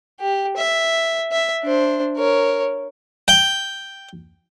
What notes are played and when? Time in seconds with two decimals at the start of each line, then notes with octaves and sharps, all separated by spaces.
0.20 G4
0.57 E5
1.32 E5
1.64 D4 C5
2.17 A#4 C#5
3.28 G5